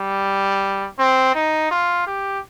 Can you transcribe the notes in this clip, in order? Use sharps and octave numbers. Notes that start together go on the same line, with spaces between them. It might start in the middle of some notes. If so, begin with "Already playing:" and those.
Already playing: G3
C4
D#4
F4
G4